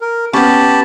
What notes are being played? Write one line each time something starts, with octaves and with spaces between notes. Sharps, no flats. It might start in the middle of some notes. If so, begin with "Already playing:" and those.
A#4
B3 C#4 G4 A5 B5